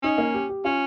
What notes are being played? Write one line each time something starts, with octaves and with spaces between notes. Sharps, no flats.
C#4 D#4
A#3
G4
G4
C#4 F4